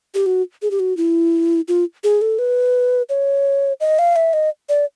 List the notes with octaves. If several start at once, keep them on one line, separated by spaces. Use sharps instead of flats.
G4
F#4
G#4
G4
F#4
E4
F4
G#4
A4
B4
C#5
D#5
F5
E5
D#5
D5